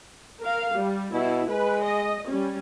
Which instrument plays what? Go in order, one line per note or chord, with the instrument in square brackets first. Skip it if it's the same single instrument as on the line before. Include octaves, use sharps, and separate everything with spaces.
[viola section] A#4 F5
G3
[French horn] B2 [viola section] E4
[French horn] G#3 [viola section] B4
[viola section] D#5
G3 C#4